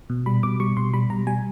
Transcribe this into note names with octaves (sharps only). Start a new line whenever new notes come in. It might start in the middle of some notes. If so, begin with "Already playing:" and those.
B2
G3 B5
B2 D6
G3 C#6
B2 C6
G3 B5
B2 A#5
G3 G#5